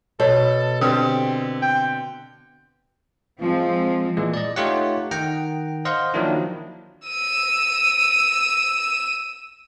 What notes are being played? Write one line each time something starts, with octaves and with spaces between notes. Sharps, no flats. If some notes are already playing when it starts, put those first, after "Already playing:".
B2 A4 C#5
D3 C4 G4 A4 B4 D#5
G5
F3 G#3 C4
A#2 E3 G#3
D5 D#5
A3 D#4 F4 G4 C#5 F#5
D#3 F#5 G5 A#5
C5 D#5 F5 F#5 C6
D#3 F3 F#3 A#3 D4 E4
E6 D#7